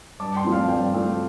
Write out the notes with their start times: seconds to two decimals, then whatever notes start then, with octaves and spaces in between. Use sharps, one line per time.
0.20 G2 A5 D6
0.36 G5 C6
0.44 F3 A3 C4
0.52 F5 A5
0.69 G2 D5 G5
0.94 F3 A3 C4